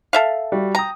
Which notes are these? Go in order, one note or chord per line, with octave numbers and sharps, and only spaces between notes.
A4 E5 F5
G3 F#4
G5 A#5 D#6